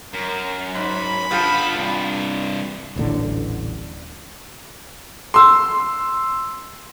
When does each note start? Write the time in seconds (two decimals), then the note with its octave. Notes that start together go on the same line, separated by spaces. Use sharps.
0.13 F#2 A#4
0.75 G#2 B5
1.31 G2 B3 F4 G4 A4
1.76 G2 C3
2.96 D#1 A1 D3
5.34 C6 E6